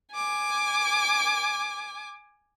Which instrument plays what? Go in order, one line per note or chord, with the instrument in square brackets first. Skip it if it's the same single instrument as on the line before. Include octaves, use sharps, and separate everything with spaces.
[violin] G#5 D6